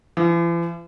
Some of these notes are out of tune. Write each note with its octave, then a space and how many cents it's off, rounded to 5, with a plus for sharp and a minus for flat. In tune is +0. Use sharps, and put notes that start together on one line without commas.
E3 +45